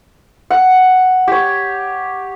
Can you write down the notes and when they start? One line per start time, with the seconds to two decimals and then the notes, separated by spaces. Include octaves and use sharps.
0.50 F#5
1.28 G4 C#5